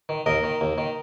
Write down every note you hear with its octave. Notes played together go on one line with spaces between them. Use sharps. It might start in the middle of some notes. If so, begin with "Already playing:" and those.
D#3
D#2 A#4 D#5
D#3
D#2
D#3